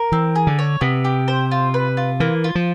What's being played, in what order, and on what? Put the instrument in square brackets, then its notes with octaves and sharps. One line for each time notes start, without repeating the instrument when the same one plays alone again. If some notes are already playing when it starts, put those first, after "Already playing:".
Already playing: [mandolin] A#4
[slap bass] E3 [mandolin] C4
[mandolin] G#4
[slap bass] D3
[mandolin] C#5
[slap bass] C3 [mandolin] B3
[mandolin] G4
C5
F4
B4
F4
[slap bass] E3 [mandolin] A#3
[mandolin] F4
[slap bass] F3